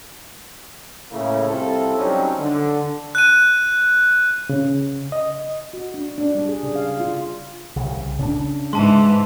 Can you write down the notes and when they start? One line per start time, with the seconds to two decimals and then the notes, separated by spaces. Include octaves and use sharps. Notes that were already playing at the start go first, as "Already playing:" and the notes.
1.11 A2 C#3 A3 A#3 C#4 E4
1.47 C2 C4 E4 F4 A4
1.96 F#3 G3 C4 C#4 D#4
2.40 D3
3.15 F#6 D#7
4.50 C#3
5.12 D#5
5.73 F#4
5.94 D4
6.18 D4
6.35 G3
6.49 G#4
6.63 C#3
6.75 F5
7.00 F4
7.76 C2 C#3
8.19 C#3 C4 D4
8.73 G#2 E3 G#3 A5 C6